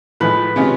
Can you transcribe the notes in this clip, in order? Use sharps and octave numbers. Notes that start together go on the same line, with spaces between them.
A2 F3 G#3 B4
C3 D#3 G#3 C#4 F4